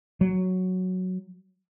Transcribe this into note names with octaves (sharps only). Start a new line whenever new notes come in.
F#3